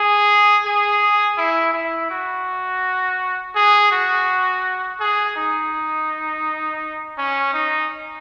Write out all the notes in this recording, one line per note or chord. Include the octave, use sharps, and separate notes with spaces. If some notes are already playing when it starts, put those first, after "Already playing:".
Already playing: G#4
G#4
E4
E4
F#4
G#4
F#4
G#4
D#4
C#4
D#4